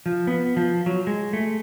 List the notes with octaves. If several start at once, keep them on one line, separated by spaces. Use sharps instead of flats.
F3
B3
F3
F#3
G#3
A3